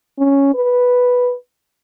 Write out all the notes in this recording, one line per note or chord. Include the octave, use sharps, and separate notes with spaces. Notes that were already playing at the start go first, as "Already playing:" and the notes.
C#4
B4